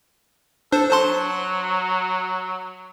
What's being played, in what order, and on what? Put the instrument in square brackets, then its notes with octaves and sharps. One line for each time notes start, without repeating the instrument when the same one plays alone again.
[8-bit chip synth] D4 C5 [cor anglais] A4
[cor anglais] F#3 [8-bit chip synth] C5 A5 C6